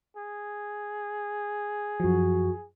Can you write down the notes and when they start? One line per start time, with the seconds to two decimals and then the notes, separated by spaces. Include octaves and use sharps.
0.17 G#4
2.00 F#2 F3 F#4